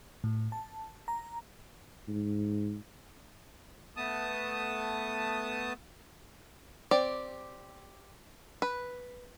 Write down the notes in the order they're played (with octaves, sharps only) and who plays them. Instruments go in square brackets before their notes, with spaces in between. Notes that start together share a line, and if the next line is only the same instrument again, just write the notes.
[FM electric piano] A2
A5
A#5
[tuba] G#2
[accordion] A3 B3 A5 D#6
[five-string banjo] C4 G4 D5
B4